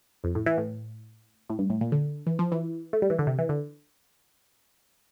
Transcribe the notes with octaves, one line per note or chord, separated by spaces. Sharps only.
F2
A2
E3
A2
A2
G2
A2
A#2
D3
E3
F3
E3
A3
G3
E3
D3
C3
E3
D3